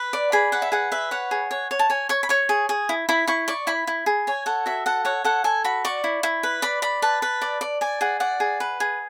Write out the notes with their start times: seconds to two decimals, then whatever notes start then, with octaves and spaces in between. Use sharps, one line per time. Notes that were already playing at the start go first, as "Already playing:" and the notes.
Already playing: B4
0.13 D5
0.32 G#4 B5
0.52 B4 F#5
0.62 E5
0.72 G#4 F#5
0.92 B4 E5
1.11 C#5 F#5
1.31 G#4
1.51 C#5
1.71 C#5
1.79 A5
1.90 C#5 G#5
2.09 C#5 C#6
2.23 B5
2.29 C#5 C#6
2.49 G#4
2.69 G#4
2.89 E4
3.09 E4 B5
3.27 E4 C#6
3.48 D5 C#6
3.67 E4 B5
3.87 E4
4.06 G#4
4.27 C#5 G#5
4.46 A4 F#5
4.66 F#4 E5
4.86 A4 F#5
5.05 C#5 F#5
5.25 A4 F#5
5.44 A4 G#5
5.64 F#4 B5
5.85 D5 C#6
6.04 E4
6.23 E4
6.43 B4
6.62 D5 B5
6.82 D5 B5
7.02 B4 A5
7.22 B4
7.42 D5
7.61 D5
7.81 D5 G#5
8.01 G#4 F#5
8.20 D5 F#5
8.40 G#4
8.60 B4
8.80 G#4